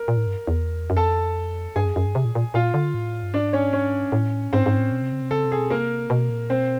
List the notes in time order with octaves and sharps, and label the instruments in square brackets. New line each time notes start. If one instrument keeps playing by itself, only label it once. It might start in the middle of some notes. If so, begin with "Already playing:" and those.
Already playing: [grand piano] A#4
[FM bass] A#2
A2
G2
E2
F#2
[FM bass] F2 [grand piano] A4 A5
[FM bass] G2 [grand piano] G#4 G#5
[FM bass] F#2
F#2
G2
C3
A#2
A#2
[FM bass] A#2 [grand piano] F4 F5
[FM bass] D3
A2
G2
[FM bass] G#2 [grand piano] D4 D5
[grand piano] C#4 C#5
C#4 C#5
[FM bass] A2
[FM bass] G#2 [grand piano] C4 C5
[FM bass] G#2
A2
B2
C3
C#3
C3
[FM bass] C#3 [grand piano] A4
[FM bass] C3
[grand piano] G#4
[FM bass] B2
[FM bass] C3 [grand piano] A#3 A#4
[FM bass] B2
A#2
[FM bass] B2 [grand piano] C4 C5